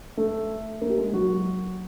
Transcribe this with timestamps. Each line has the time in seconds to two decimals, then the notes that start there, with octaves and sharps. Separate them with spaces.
0.17 A3 A4
0.81 A#3 A#4
0.90 G4
0.97 G#3 G#4
1.13 F#3 F#4